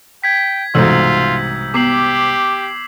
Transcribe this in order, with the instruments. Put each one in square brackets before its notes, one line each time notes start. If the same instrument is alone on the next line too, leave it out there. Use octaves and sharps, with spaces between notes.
[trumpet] G5 [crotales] G#6 B6
[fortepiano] C2 G#2 B2 [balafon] E3 A4 [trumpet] F4 [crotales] E6 G6
[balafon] B3 [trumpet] G4 [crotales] D6 C7 F#7